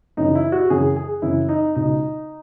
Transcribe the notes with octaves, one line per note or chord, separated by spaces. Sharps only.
F#2 C#3 E3 D#4
E4
F#4
F#2 C#3 E3 G#4
G#4
F#2 C#3 E3 E4
D#4
C#2 B2 D#4